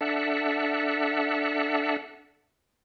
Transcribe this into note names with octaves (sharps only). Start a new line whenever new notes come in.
D4 A4 E5 F#5